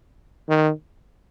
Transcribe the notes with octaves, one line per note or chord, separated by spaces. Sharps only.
D#3